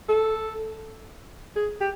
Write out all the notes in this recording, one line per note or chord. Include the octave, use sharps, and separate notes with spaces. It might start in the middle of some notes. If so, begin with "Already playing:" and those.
A4
G#4
G4